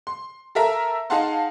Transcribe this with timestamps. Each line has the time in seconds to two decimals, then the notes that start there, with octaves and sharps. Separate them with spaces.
0.07 C6
0.55 A4 A#4 E5 A#5 E6
1.10 D#4 G#4 F5 F#5 A5 C6